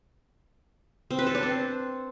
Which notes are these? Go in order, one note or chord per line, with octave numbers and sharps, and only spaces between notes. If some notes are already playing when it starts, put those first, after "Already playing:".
C4
B4
A4
D4
C4